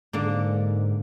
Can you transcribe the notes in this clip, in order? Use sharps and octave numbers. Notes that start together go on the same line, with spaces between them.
G#2 D3 A#3